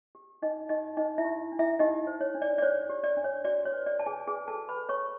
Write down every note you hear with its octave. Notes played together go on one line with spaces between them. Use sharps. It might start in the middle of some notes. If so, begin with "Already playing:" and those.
G4
D4 D#4 D#5
D#4 G4 D#5
D#4 C5 D#5
E4 E5
G4
D4
E4 E5
D#4 G4 D#5
C5
C#5
D4
D5
D5
C5 C#5
G4
D5
D4
C#5
F#4 D5
C#5
B4
D5
B4 A5
G#4 G#5
G#4 B4 G#5
A4 A5
F#4
B4 B5
B4
C#5 C#6